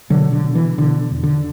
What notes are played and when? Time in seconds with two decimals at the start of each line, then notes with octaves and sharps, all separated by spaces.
0.10 B2 D3 F#3
0.33 D3
0.44 B2
0.55 E3
0.78 B2 D3
1.11 E2
1.23 D3